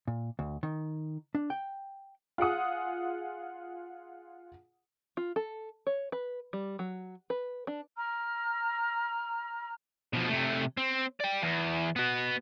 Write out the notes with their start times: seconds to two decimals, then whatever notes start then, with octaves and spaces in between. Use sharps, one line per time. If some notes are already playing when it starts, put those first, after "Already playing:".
0.07 A#2
0.39 D2
0.63 D#3
1.35 D4
1.50 G5
2.38 F4 G#4 F#5 D#6
5.17 F4
5.36 A4
5.87 C#5
6.12 B4
6.53 G3
6.79 F#3
7.30 B4
7.67 D4
7.96 A#5 F6
10.13 B2 F3
10.28 C3 A3
10.77 C4
11.20 D5 G5
11.42 E2
11.96 B3 F#4